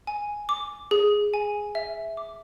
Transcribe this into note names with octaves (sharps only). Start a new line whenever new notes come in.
G#5
D6
G#4
G#5
E5
D6